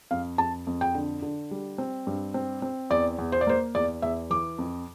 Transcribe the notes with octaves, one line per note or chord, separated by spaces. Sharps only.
F2 F5
F2 A5
F2
G5
D3
D3
G3
C4
G2
C4
C4
E2 D5
E2
C5
D5
A#3 C5
E2 D5
E2 E5
E3 D6
F2